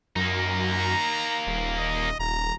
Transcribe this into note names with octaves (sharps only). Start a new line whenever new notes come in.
F#2 A#3 D#4
A#5
D#1
D#5
D#1 A#5